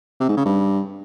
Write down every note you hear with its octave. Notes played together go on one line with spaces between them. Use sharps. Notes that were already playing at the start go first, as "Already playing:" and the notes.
C3
G#2
C#3
G2